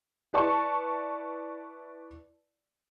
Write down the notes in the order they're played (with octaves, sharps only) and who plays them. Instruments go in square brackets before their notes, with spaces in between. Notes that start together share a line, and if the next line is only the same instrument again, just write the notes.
[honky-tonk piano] E4 B4 D5 A5 C#6